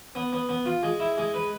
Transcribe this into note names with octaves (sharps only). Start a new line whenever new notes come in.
B3
B3
B3
F4
G#3
E4
G#3
B4